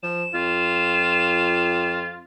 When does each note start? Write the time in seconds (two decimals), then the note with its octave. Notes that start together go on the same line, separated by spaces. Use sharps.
0.03 F3 E7
0.34 F2 F4